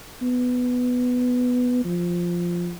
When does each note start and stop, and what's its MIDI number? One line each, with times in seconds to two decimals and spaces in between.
0.22 1.81 59
1.84 2.76 53